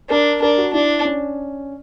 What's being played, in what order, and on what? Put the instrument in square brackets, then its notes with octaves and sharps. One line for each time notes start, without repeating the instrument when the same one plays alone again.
[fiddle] D4 [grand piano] A#4
[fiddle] D4 [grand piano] A#4
[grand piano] F#4
[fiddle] D4 [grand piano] E4
[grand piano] C#4